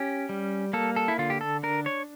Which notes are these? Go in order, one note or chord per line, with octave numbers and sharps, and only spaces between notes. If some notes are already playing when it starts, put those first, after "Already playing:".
Already playing: C#4 G4
G3
A#3 A4
A4
E4
D3 F4
G4
A4
D4 A#4
C#5